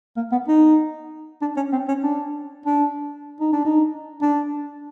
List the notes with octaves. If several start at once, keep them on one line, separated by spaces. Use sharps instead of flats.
A#3
B3
D#4
D4
C#4
C4
C#4
D4
D4
D#4
D4
D#4
D4